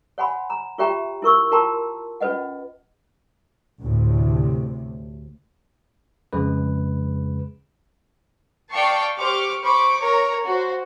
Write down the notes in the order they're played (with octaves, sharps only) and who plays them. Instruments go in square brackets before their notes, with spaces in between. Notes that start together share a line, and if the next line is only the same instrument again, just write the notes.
[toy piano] C#5 F#5 G#5 B5 C6
A#5
F4 G4 C#5 E5 G5 A#5
E4 A#4 C#6 E6
F4 A#4 G5 A5 A#5 C6
C#4 F4 B4 D#5 F#5
[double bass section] D2 A2 C3
[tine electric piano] F2 C#3 G#3 B4
[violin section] D5 F5 G5 A5 C#6 C7
G4 C5 C#6 D6 F6
C5 B5 C#6 D6
A#4 C#5 A#5
F#4 C5